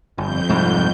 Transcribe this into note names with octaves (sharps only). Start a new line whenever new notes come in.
G1 F2 G6
C2 G#2